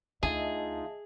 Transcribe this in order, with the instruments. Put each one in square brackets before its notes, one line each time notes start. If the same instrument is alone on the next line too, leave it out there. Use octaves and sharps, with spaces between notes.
[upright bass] D2 D3 [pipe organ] D#4 F4 [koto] G#4 [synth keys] D#5 E5 A5